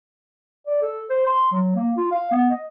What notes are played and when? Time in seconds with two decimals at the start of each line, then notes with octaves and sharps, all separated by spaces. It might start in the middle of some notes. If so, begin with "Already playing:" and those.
0.67 D5
0.82 A4
1.10 C5
1.26 C6
1.52 F#3
1.76 A#3
1.97 F4
2.12 F5
2.32 B3
2.50 D#5